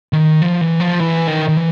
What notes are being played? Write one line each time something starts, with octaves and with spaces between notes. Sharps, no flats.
D#3
F3
E3
F3
E3
D#3
D#3
E3